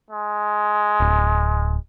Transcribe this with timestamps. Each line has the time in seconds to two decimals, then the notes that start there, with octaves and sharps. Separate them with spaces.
0.11 G#3
1.00 D1